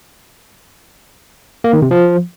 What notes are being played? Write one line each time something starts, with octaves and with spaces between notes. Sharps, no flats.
A#3
D#3
C3
F3